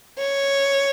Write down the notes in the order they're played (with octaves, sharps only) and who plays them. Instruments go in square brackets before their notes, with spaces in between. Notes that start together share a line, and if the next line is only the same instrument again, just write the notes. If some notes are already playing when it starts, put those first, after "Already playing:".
[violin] C#5